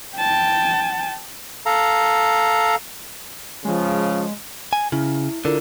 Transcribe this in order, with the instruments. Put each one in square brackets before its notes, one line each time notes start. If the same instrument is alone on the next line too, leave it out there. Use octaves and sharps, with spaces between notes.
[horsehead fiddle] G5 A5
[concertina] A4 F5 A#5
[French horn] C#3 [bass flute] F3 [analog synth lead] G#3
[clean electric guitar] G#5
[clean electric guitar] C#3 [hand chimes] E4
[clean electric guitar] D3 [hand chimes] E4 F4 A#4